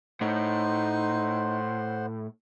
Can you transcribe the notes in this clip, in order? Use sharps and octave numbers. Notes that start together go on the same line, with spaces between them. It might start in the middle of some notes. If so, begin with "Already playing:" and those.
A2 D#4 C5 F#5 C6